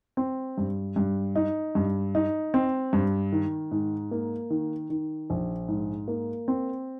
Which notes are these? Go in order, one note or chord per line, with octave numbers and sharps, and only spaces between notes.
C4
G2
G2
D#4
G2
D#4
C4
G2
D#3
G#2
A#3
D#3
D#3
A#1
G#2
A#3
C4